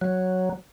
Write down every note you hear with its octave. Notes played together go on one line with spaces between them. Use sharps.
F#3